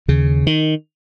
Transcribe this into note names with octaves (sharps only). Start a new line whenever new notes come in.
D#2 C#3
D#3